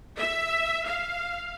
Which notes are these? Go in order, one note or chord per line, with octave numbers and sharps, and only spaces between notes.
E5
F5